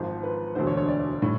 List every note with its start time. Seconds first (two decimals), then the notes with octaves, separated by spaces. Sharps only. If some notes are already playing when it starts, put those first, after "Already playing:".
Already playing: G#1 G#2 F3 C5
0.23 B4
0.55 E1 D2 D3 C5
0.67 C#5
0.77 C#5
0.88 D5
1.22 A2